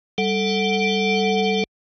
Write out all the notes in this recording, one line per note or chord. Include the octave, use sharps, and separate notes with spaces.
G3 A4 F#5